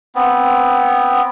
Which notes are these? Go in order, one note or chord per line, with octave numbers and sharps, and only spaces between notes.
B3 C4